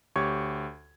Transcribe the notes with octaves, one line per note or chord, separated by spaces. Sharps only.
D2 G4 C#5 C#6 G#6